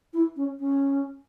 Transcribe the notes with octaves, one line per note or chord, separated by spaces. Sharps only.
E4
C#4
C#4